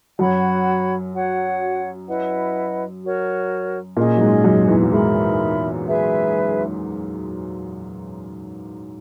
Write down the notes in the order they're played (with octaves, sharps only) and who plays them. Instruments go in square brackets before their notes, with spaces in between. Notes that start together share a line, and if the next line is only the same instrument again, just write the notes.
[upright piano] F#2 F#3 [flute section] F#4 C#5 F#5 B5
[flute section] F#4 C#5 F#5
E4 B4 D#5 F#5
F#4 A#4 C#5
[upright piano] A#2 A#3 [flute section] C#4 G#4 D#5
[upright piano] F#3
G#2 G#3
F#2 F#3
E2 E3
F#3
[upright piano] G#2 G#3 [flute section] D#4 A#4 E5 B5
[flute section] G#4 B4 E5